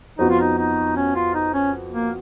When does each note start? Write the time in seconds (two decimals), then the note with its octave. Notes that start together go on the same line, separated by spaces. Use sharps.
0.19 F2 F3 B3 D#4 F#4
0.30 F4
0.40 D#4
0.58 D#4
0.96 C#4
1.15 F4
1.35 D#4
1.54 C#4
1.93 A#3